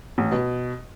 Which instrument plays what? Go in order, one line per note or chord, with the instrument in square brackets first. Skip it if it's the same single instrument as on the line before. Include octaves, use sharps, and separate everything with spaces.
[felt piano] A1
B2